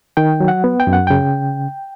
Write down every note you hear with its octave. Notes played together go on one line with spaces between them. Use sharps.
D#3 G5
F#3
F#5
B3
G5
F#2
F#5
C#3 G5